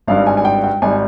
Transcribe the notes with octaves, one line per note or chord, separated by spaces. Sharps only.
G#1 G2 G3 F5
G#5
G#5
G5
G5
G#1 G3 G#5